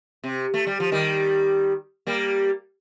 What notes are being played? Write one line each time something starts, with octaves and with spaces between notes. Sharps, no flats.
C3
A3
G3
F3
D#3 G3
G3 A#3